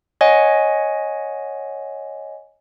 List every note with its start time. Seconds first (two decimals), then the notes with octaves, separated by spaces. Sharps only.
0.21 C#5 D#5 F#5 G#5